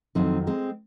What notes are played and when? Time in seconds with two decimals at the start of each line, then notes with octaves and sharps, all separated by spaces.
0.15 F2 D#3 F#3 C4 D#4
0.47 G#3 C4